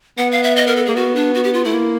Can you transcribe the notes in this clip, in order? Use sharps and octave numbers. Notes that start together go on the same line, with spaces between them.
B3 F#5
F5
E5
D#5
A#4
A4
A#3 G#4
B3 F#4
D4
F#4
G4
F4
A3 E4
A#3